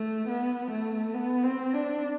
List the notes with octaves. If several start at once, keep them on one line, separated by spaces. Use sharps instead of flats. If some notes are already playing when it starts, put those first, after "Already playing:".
Already playing: A3
B3
A3
B3
C4
D4